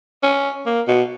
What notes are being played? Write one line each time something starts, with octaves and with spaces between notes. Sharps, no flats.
C#4
A#3
B2